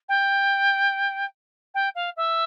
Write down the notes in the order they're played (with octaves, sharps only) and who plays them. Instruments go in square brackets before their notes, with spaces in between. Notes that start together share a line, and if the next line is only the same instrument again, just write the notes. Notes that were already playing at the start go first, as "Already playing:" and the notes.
[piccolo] G5
G5
F5
E5